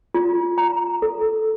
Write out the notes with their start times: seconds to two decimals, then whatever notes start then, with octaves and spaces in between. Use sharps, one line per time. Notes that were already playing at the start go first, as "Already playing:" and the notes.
0.15 F4
0.58 A#5
1.02 A4